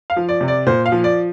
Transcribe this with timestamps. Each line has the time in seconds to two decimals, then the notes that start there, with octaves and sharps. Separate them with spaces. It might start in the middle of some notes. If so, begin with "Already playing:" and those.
0.10 F5
0.16 F3
0.29 D5
0.41 C3
0.48 D5
0.66 A#2 C5
0.86 F5
0.92 F3
1.04 D5